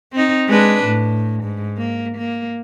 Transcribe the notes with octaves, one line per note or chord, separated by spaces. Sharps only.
C4 D#4
G#3 D4 B4
A2
G#2
A#3
A#3